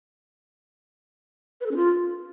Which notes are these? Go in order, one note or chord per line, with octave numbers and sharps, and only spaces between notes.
B4
A4
C#4
F4